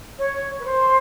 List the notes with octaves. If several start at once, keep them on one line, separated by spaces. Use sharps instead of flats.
C#5
B4
C5